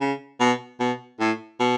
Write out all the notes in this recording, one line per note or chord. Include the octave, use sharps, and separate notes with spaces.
C#3
B2
B2
A2
B2